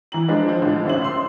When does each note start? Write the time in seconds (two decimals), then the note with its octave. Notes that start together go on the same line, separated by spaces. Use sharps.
0.12 E3 A#5 F#7
0.28 F3 G#3 D4 B4
0.49 F3
0.61 A2 D3 F3 G#3
0.85 A1 D#2 C#3 C5 E5 F#7
1.04 C6 E6